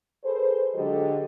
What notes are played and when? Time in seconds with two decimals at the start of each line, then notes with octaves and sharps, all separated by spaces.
0.24 G#4 A4 B4 C5
0.75 D3 F#3 G#3 G4 A4 D#5